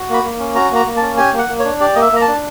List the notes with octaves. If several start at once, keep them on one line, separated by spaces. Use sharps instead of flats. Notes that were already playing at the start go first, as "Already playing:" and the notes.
Already playing: F#4
A#3 B5
A#3
C#4
F#4 A#5
A#3 A#5
A#3
A5
C#4
G4 G#5
A#3
F#5
A#3
C#5
D4
G4 D5
A#3 D#5
E5
A#3 A#5
A5
D4